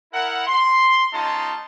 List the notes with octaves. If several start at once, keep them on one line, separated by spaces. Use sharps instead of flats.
E4 A#4 F#5
C6
G#3 C#4 D#4 F4 A5 C6